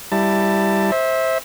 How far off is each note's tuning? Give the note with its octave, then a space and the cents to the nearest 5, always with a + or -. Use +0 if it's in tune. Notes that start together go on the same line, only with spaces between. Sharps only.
G3 +0 E4 +0 A5 +15
C5 +15 E5 -20